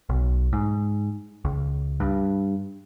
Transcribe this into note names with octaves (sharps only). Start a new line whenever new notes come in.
B1
G#2
C#2
G2